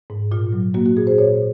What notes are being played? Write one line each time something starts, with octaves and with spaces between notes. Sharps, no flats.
G#2
A#2 F4
F#3
A#3 F#4
F#4
A#2 G#4
C5
A#2 C#5